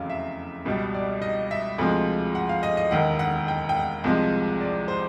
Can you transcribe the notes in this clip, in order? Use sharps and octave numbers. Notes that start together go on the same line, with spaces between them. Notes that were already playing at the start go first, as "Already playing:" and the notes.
Already playing: F1 E2 C#3 F#3 F5
E5
C#2 B2 G3
D5
D#5
E5
D2 C3 F3 G#3
F#5
F5
D#5
D#5
E1 D#2 D#3 F#5
F#5
G5
G5
F#5
C2 C3 F3 G#3
D5
C5